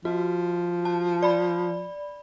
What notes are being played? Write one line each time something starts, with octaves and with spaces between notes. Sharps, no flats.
F3 F#4
A5
D5 B5